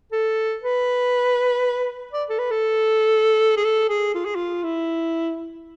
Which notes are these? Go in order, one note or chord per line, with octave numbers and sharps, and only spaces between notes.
A4
B4
D5
A4
B4
A4
G#4
A4
G#4
F4
G#4
F4
E4